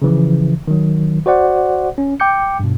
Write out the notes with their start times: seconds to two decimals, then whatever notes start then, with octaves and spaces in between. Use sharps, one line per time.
0.02 C#3 E3 F3
0.68 D#3 F#3
1.26 F#4 C5 D5 F#5
1.98 C#4
2.20 G5 D6 G6 C#7
2.60 G2 B2